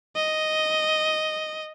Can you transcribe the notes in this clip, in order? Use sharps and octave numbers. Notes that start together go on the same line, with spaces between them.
D#5